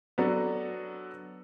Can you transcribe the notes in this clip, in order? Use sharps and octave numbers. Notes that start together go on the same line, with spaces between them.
F#3 B3 D4 F#4 A4